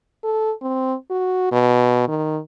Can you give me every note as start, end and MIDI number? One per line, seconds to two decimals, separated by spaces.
0.24 0.52 69
0.62 0.94 60
1.10 1.49 66
1.52 2.07 47
2.08 2.39 51